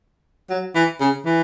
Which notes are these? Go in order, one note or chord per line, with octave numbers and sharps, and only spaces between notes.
F#3
E3
C#3
E3